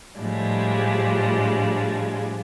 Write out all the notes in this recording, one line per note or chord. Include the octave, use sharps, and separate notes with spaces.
A2 F3 G3 G#3 D4